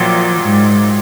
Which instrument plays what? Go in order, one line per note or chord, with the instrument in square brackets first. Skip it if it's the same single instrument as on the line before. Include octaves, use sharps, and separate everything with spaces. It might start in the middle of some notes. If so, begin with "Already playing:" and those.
Already playing: [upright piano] A#1 A#2 F#3 [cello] F3
[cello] G#2